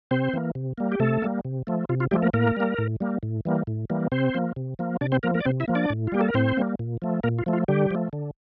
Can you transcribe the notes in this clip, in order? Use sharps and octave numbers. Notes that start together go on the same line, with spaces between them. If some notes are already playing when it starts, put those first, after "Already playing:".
C3 C4 C5
E3 A#3
C3
G3 A#3
G4
C3 A3 A4
G3 A#3
C3
F3 A3
C3 F4
F4
F3 G3 A3 G4
A#3 A#4
A2 A#3 A#4
G3 A#3
A2
G3 A#3
A2
E3 G3 A#3
A2
E3 G3 A#3
C3 C4 C5
F3 A#3
C3
F3 A#3
C3 D4 D5
C4 C5
F3 A#3 A#4
A#3 A#4
D5
C3 C4 C5
E4 E5
F3 A#3
D4 D5
A2
F4
G3 A#3 G4
A4
A#4
A2 C4 C5
G3 A#3
A#2
F3 A3
A#2 A#3 A#4
F4
F3 A3
F4
D3 G3 G4
F3 A3
D3